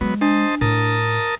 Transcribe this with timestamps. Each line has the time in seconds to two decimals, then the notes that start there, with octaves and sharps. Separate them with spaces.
0.01 F#3 G#3 B3
0.21 D4 C5 D#5 A5
0.61 A2 A#4 A5 D#6